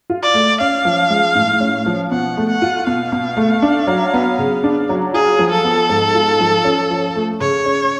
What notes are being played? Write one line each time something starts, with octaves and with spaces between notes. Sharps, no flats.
F4
D5
A3
C#4 F5
F3
G#3
A2
C#4
F3
B2 F#5
A3
F#5
F4
B2 F5
B2
A3
D4
F#3
B3
C#3
D4
F#3
F4 G#4
F3
A4
B3
G#2
F4
F3
C#4
F3
A3
C#3 C#5
C#4